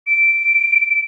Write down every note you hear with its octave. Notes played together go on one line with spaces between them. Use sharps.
D7